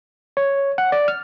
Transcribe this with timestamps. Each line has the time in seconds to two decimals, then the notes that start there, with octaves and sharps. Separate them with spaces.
0.37 C#5
0.78 F#5
0.92 D5
1.08 F6